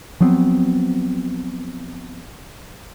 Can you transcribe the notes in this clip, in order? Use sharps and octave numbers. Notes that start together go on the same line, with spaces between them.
F3 F#3 B3 C4